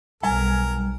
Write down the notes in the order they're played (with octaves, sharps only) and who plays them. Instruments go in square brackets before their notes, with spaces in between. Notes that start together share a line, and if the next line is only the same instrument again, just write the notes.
[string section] B1 [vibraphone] G3 [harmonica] A#4 [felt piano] G#5